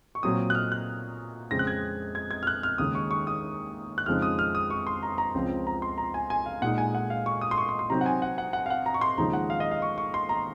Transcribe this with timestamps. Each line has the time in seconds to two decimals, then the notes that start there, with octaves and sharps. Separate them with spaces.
0.15 C#6
0.23 A#2 F#3 C4 D#6
0.50 F#6
0.55 F6
0.72 F#6
1.51 F2 C#3 G#3 C4 A#6
1.59 F#6
1.67 G#6
2.15 G#6
2.31 G#6
2.43 F6
2.47 F#6
2.63 F6
2.78 D#2 C#3 G#3 D#6
2.95 C#6
3.11 C#6
3.27 D#6
3.98 F#6
4.06 F2 C#3 F3 G#3 D#4 F6
4.22 D#6
4.39 F6
4.55 D#6
4.70 C#6
4.87 C6
5.03 A#5
5.18 A#5
5.34 C#2 C#3 F3 C4
5.67 A#5
5.82 C6
5.98 A#5
6.14 G#5
6.30 G#5
6.46 F5
6.62 A#2 G#3 D#4 F#5
6.78 G#5
6.95 F#5
7.10 F5
7.26 C#6
7.41 D#6
7.51 C6
7.58 C#6
7.69 C6
7.79 C6
7.90 C3 F#3 C4 D#4 A#5
8.01 F#5
8.06 G#5
8.22 F#5
8.38 F#5
8.53 F#5
8.66 F5
8.70 F#5
8.86 A#5
8.94 C#6
9.01 C6
9.18 D#2 C#3 F3 G#3 D#4 A#5
9.33 F#5
9.50 F5
9.60 D#5
9.71 F5
9.82 C#6
9.98 C#6
10.14 C6
10.29 A#5